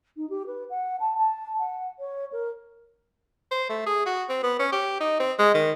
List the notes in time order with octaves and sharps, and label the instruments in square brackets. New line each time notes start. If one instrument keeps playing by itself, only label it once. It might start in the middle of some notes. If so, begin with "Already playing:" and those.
[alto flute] D#4
G4
B4
F#5
A5
A5
F#5
C#5
A#4
[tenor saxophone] C5
A3
G#4
F#4
C4
B3
C#4
G4
D#4
C4
G#3
D#3